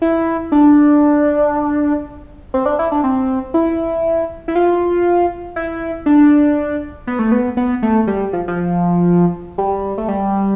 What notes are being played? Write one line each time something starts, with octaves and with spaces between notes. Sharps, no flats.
E4
D4
C4
D4
E4
D4
C4
E4
E4
F4
E4
D4
B3
A3
B3
B3
A3
G3
F3
F3
G3
A3
G3